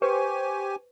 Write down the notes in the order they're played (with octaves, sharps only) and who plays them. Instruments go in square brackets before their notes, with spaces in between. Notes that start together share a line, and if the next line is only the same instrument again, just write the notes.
[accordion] G4 G#5 [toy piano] B4 [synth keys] C5 C#6